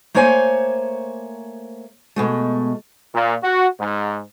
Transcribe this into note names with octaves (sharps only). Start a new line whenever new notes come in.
A3 A#3 C5 C#5 G#5
B2 G#3 A3
A#2
F#4
G#2